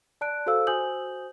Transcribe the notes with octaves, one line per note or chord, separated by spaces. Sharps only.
D5 A5 F#6 D7
F#4 A4 C5 F5 E6
F#4 C5 G#5 D#6 G6 F#7